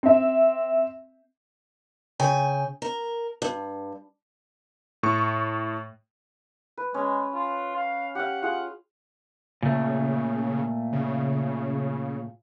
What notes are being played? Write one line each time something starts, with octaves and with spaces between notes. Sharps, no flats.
C4 E5
C#3 G5 G#5
A#4
G2
A2 C#6
B4
G#3 C#4
F4
F5
G4 F5 F#5
F4 G#4 F#5
A#2 C#3 A3
C#3